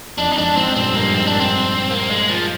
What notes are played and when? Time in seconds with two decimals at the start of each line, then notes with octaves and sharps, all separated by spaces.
0.18 F2 D4
0.32 D#4
0.37 F2 G#2 D4
0.57 F2 G#2 C4
0.76 G2 A#2 C4
0.95 G2 A#3
1.14 F2 G#2 C4
1.27 D4
1.40 C4
1.91 A#3
2.10 G#3
2.29 F3